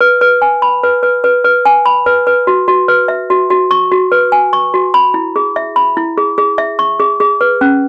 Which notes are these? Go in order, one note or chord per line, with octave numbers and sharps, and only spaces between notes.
B4
B4
G#5
B5
B4
B4
B4
B4
G#5
B5
B4
B4
F#4
F#4
B4
E5
F#4
F#4
C#6
F#4
B4
G#5
C#6
F#4
B5
E4
G#4
E5
B5
E4
G#4
G#4
E5
C#6
G#4
G#4
B4
C#4